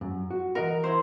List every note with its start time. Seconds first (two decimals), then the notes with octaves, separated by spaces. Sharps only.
0.01 F#2
0.31 F#4
0.55 E3 A#4 D#5 F#5
0.84 E4 C5